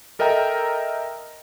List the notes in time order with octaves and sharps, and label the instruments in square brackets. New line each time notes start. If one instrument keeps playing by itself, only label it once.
[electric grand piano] A4 A#4 D#5 E5 G5 A#5